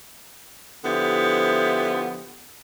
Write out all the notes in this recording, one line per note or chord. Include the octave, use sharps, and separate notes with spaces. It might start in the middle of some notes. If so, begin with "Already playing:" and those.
D3 F3 B3 E4 G4